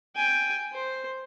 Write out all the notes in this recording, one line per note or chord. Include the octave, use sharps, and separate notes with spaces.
G5 G#5
C5